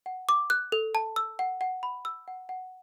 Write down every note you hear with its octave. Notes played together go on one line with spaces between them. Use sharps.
F#5
D6
F#6
A4
A5
E6
F#5
F#5
B5
E6
F#5
F#5